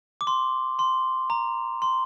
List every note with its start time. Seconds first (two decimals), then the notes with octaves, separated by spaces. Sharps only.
0.21 D6
0.27 C6
0.79 C6
1.30 A#5
1.82 C6